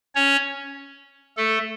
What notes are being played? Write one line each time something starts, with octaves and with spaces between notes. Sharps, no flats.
C#4 C#5
A3 A4